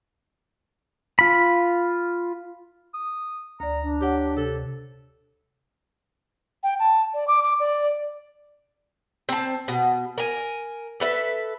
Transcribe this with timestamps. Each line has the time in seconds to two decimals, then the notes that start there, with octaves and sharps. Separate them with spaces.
1.19 F4 B5
2.94 D#6
3.60 D2 D5 A#5
3.82 D4
4.01 G4 C#5 F#5
4.37 C3 A4
6.63 G5
6.79 A5
7.14 D5
7.28 D6
7.43 D6
7.60 D5
9.29 C4 A5
9.68 B2
10.18 A#4 G#5
11.00 A4 B4 E5